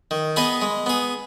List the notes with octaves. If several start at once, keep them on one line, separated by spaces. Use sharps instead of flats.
D#3
B3 G#4 B4 D#5
G#3
B3 G#4